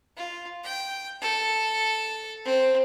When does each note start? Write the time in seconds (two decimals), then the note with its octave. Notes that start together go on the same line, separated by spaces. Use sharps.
0.17 F4
0.64 G5
1.21 A4
2.45 C4